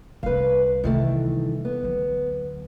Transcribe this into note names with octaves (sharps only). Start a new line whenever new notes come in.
C2 C#4 B4 F5
C3 D#3 E3 G3 A3
B3
D2 F#3